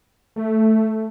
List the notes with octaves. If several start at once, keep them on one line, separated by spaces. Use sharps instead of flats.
A3